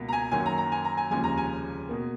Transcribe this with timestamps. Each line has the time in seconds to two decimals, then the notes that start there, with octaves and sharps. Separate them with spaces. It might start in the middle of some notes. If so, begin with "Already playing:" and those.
Already playing: C#2 B2 A#3
0.09 A#5
0.13 G#5
0.31 F#2 D#3 F#3 A#3 G#5
0.46 A#5
0.58 A#5
0.72 G#5
0.85 A#5
0.97 G#5
1.11 F1 D#2 C#3 F3 G#3 G#5
1.24 A#5
1.38 G#5
1.89 B2 A#3